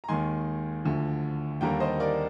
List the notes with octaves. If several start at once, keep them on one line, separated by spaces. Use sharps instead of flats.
A#5
D#2 D#3 G#3 G#5 C6
D2 D3 F3
D#2 D3 G3 A#3 G5 A#5
C5 D#5
A#4 D5